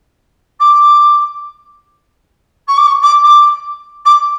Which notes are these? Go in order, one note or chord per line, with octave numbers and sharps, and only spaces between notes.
D6
C#6
D6
C#6
D6
D6
D6